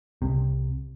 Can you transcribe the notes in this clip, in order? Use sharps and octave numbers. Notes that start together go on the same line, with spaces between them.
C2 C3